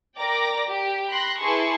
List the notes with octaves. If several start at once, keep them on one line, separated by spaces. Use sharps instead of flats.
A#4 D5 G5 A#5 D6 A#6
G4
B5 C6 F#6 A#6
E4 G#4 B4 A5 C6 C#6